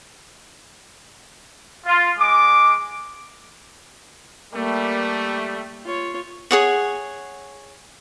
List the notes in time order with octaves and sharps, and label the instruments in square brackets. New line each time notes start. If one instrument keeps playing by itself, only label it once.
[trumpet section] F4
G#3 D6
[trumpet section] G3 A3 [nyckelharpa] A#3
[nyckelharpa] F4 C#5
[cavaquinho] G#4 C#5 F#5